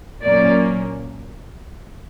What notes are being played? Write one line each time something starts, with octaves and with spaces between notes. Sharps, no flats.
A#2 F#3 A#3 C#4 D5